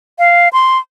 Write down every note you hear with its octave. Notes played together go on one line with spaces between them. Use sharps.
F5
C6